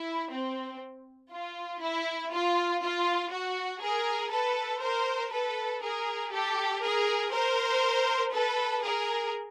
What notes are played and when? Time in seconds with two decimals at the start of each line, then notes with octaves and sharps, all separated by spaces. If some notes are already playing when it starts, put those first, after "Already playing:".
Already playing: E4
0.30 C4
1.31 F4
1.81 E4
2.31 F4
2.82 F4
3.31 F#4
3.81 G#4 A#4
4.31 A4 B4
4.81 A#4 C5
5.31 A4 B4
5.81 G#4 A#4
6.32 G4 A4
6.82 G#4 A#4
7.32 A#4 C5
8.32 A4 B4
8.83 G#4 A#4